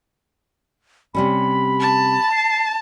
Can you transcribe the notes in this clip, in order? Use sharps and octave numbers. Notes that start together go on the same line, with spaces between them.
C3 G3 C#4 B5
A5
C7